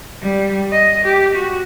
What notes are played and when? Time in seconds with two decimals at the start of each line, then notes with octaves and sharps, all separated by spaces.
0.22 G3
0.71 D#5
1.05 G4
1.35 F#4